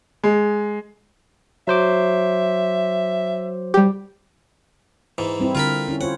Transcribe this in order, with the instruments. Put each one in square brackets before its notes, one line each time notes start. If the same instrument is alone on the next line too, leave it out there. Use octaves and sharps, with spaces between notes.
[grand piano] G#3
[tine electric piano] F#3 C5 D6 [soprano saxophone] E5
[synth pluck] G3 G4
[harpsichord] G#2 E3
[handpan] G3 C4 E4
[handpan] D3 [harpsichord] F4 A#4 B5
[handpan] C#4 E4
[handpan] F4 C5 C#5 [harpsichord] F#5